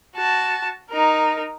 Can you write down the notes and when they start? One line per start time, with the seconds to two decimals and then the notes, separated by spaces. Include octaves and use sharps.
0.16 F#4 A5
0.90 D#4 A#4